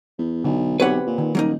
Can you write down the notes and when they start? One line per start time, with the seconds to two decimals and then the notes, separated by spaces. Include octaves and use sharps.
0.18 E2
0.44 B1 D3
0.80 B1 C4 G4 B4 C#5 F#5
1.07 A#2
1.18 D#3
1.35 D#1 F#3 A#3 D#4